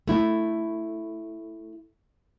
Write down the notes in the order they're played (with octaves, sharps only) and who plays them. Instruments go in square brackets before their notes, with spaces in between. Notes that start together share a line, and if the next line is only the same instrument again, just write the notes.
[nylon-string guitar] A3 E4